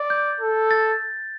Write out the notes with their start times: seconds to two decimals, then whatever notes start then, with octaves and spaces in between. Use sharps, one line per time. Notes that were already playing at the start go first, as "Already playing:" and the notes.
Already playing: D5
0.10 G6
0.41 A4
0.71 A6